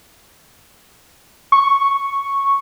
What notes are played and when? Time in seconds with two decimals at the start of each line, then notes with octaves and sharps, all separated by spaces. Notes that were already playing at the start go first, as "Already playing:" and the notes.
1.52 C#6